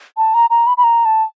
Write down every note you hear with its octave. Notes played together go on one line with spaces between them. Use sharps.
A5
A#5
A#5
B5
B5
A#5
A5